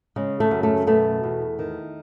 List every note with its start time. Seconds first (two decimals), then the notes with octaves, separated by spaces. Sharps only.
0.16 C#3 G#3
0.40 A3
0.51 F#2
0.63 A3
0.87 B2 A3
1.24 E2
1.59 D#3